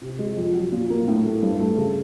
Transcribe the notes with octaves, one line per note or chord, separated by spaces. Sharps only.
C3
G#3
F2
F#3
A#2
A#3
A2
A3
G2
A3
C#3